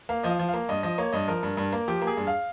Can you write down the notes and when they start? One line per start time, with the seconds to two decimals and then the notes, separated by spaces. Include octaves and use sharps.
0.09 A#3 F5
0.23 F3 D#5
0.29 F5
0.39 F3
0.48 F5
0.54 A#3
0.69 G2 D#5
0.83 F3 D#5
0.98 A#3 C#5
1.12 G2 D#5
1.28 F3 A#4
1.43 G2
1.57 G2
1.73 A#3
1.88 F3 G4
2.02 A#3
2.07 G#4
2.17 G2
2.27 F5